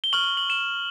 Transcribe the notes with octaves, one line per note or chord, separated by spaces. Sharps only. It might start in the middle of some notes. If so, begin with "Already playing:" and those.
G7
C#6 F6 F#7
G7
F#7
E7